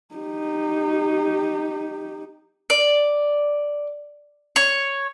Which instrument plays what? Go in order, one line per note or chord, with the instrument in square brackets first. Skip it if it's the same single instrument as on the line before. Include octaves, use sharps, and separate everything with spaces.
[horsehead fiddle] D#4 G4
[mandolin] D5
C#5